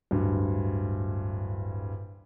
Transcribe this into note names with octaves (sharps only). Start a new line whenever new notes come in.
D1 G2